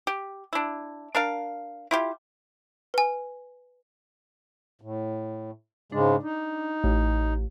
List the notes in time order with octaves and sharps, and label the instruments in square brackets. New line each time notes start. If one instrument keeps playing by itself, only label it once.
[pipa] G4
D4 E4
D4 A#4 F5
E4 F4 G4
[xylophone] B4 G#5
[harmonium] A2
[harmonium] G#2 C#3 G#3 [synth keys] D4
[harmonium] D#4
[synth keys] A1